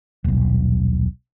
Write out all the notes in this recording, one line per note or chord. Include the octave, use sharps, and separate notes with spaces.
D#1 B1